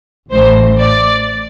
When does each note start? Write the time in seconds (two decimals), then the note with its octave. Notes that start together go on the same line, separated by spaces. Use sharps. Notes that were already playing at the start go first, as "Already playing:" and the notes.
0.31 A1 A2 E3 C5
0.81 D5